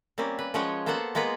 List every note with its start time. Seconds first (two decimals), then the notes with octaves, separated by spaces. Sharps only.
0.18 G3 A#3 C4 C#4
0.39 B4
0.54 F3 G#3 C#4 C#5 F#5 G5
0.86 A#3 B3 A4 C5 F#5 A5
1.15 G#3 A#3 B3 F4 B4